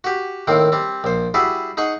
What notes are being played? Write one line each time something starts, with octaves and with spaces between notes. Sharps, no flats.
F#4 G4
A2 D#3 A#3 C4
G3 C4
A#1 C5
G3 E4 F#4 G#4
D#4 G#4 F#5 C#6